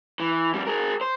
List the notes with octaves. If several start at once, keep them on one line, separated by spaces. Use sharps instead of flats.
E3
F2 G3
G#4 A#4
C5